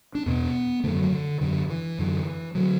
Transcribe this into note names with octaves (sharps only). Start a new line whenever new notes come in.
D4
E2 B2 B3
F#2 D3 A3
F#3
D3
F#2 D3
E3
F#2 D3
D3 F#3